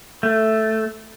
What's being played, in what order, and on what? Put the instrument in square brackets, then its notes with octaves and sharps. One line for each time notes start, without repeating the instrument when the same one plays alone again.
[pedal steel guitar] A3